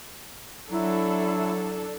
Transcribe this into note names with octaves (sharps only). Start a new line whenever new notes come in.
F#3 D4 E4 A4